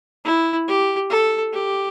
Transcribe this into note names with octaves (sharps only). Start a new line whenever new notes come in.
E4
G4
A4
G4